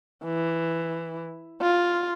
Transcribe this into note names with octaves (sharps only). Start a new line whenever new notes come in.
E3
F4